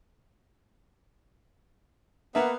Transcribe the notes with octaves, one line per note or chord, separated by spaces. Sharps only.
A#3 B3 E5